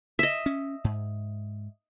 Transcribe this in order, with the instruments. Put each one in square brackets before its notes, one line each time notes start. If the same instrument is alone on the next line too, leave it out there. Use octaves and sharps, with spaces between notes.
[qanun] D#5 E5
[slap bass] C#4
G#2